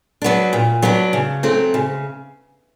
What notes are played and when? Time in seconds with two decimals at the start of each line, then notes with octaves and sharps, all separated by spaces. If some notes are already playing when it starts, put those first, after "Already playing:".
0.22 F#3 B3 D4
0.53 A#2
0.82 F#3 B3 D4
1.13 C#3
1.43 F#3 A3 C4
1.74 C#3